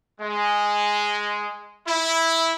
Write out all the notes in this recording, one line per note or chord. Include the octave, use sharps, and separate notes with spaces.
G#3
E4